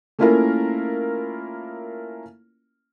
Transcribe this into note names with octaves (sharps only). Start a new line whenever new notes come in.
A3 A#3 C#4 E4 F4 A#4